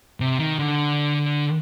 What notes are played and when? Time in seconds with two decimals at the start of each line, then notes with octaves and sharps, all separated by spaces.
0.20 C3
0.39 D#3
0.59 D3